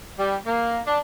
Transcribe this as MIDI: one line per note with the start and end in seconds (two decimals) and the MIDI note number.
0.18 0.36 55
0.45 0.79 58
0.86 0.99 62